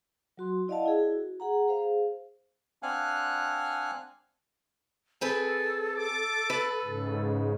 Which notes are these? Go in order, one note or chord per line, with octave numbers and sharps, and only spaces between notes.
F#3 F#4 C6
E4 D5 D#5 F5 F#5 A5
E4 G#4
F#4
G#4 F#5 A#5
G#4 C5 F5
C4 D4 F5 F#5 G#5 F#6
C4 G#4 A4 B4
D6
B4
G#2 C#3